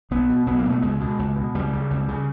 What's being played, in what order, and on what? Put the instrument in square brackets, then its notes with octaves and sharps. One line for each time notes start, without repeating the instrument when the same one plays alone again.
[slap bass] B1 B3
B2
B1 B3
A#3
B2 A3
C#2 G#3
B2
C#2
B2
C#2 G3
C#3
C#2
C#3